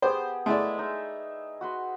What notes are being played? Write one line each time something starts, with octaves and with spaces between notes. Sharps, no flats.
B3 G4 G#4 C5
G#3 A3 E4 G#4 D5
D#4 A#4 E5
F#4 B4 C6